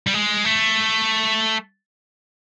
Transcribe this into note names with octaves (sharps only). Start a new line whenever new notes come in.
G3
G#3
A3